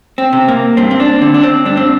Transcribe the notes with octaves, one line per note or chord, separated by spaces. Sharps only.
C4
C3
A#3
G2 C4
C4
D4
D3 C4
D4
C4
G2 D4
C4